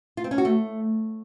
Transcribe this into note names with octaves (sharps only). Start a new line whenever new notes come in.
F4
C4
C#4
F#4
A3